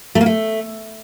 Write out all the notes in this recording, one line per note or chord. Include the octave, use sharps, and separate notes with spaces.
A3
A#3
A3